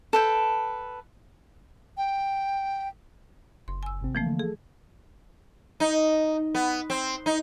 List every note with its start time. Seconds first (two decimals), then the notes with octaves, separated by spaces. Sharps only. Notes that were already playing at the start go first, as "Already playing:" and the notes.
0.13 A4 B4 G5
1.97 G5
3.68 F#1 C6
3.83 G#5 E6
4.01 G#1 C3 C4
4.15 E3 F3 A3 A#3
4.26 D3
4.39 G#4 A4
5.80 D#4
6.55 B3
6.90 C4
7.26 D#4